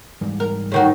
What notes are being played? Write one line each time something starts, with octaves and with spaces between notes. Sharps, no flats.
G#2 E3 G3
A#4
A2 D#3 F#4